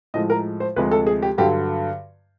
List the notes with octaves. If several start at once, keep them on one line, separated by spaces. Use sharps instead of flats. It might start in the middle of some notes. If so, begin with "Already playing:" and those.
A2 F3 G#3 D#5
A#4
C5
D2 C3 F3 G#3 B4
A4
G#4
G4
G2 D3 F#3 G4